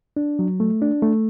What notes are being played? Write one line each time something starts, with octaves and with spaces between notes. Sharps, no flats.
D4
F#3
A3
D4
A3